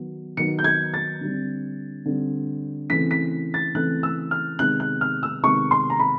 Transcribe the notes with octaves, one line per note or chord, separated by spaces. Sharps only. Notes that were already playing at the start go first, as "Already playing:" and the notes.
Already playing: D#3 F#3 B3
D#3 F#3 B3 C#7
G6
G#6
A6
D3 G3 C4
D3 G3 C4
C#3 E3 A3 C4 B6
B6
A6
C#3 E3 A3 C4 F#6
E6
F6
C3 D#3 G#3 B3 F#6
F#6
F6
E6
C3 D#3 G#3 B3 C#6
C6
A#5
B5